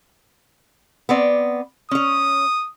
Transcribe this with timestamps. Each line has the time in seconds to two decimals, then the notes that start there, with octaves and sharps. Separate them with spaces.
1.09 B3 C4 D5
1.91 C#4 C#5 D#6